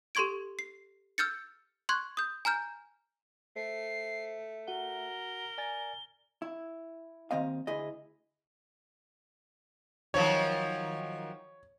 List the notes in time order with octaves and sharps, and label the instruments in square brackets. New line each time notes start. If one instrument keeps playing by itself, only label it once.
[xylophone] G4 A4 C6 C#6 G#6 D7
C7
E6 F6 G6 A6 C#7
C6 C#6 F#6 G#6
D#6 G6
G#5 A#5 F6 G6
[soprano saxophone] A3 [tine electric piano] C5 [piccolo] C7
[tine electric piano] F#4 F#5 [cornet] A#4 [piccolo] G7
[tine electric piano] D5 G#5 A6
[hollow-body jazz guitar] E4
D#2 D#3 C4 D#5 F5
D2 E4 G#4 D#5
[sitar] D#3 F3 F#3 [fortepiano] C#5